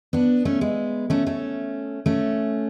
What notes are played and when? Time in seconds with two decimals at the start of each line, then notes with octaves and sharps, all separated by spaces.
0.13 B3 D4
0.45 A3 C#4
0.61 G#3 B3
1.10 A3 C#4
1.27 A3 C#4
2.06 A3 C#4